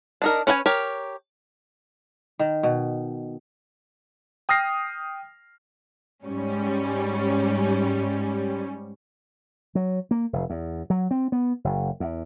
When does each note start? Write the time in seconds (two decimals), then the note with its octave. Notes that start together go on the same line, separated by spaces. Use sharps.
0.22 D4 D#4 A#4
0.47 C#4 B4 C#5 F#5 G#5
0.66 G4 A#4 C#5
2.39 D#3
2.63 B2
4.49 G5 D#6 F6 A#6 C7
6.25 G#2 G3 C#4
9.75 F#3
10.11 A#3
10.33 F1
10.50 E2
10.90 F#3
11.11 C4
11.32 B3
11.64 F#1
12.00 E2